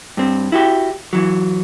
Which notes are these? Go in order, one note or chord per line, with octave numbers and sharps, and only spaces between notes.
G2 C4
E4 F#4 G4
E3 F#3